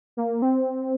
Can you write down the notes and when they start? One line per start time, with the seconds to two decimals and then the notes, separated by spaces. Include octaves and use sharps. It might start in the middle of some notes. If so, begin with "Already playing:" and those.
0.17 A#3
0.42 C4